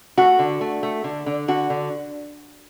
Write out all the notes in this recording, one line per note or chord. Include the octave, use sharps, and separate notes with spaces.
A3 F#4
D3
A3
A3
D3
D3
D3 F#4
D3